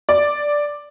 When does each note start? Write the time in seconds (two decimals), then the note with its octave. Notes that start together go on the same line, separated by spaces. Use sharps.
0.09 D5